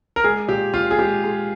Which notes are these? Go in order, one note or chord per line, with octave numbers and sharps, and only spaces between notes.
A#4
G#3 G#4
A#2 G4
A#2 F4
G#4
G#3 G4
G#3